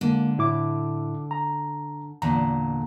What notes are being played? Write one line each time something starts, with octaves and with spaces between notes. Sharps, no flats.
D3 G#3 A#3
A2 E4 D6
A#5
E2 A#2 D3 A#5